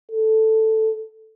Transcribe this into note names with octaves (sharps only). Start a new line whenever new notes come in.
A4